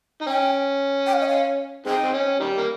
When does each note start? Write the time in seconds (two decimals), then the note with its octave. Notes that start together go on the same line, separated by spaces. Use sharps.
0.21 D#4
0.27 C#4 G5
1.06 G5
1.13 F5
1.21 D#5
1.28 F5
1.86 G#3 C4 D#4 G5
2.03 C4
2.13 C#4
2.40 D#3 G3
2.57 A#3